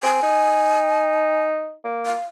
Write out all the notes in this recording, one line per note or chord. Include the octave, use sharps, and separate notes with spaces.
C4 G#5
D#4
A#3
F5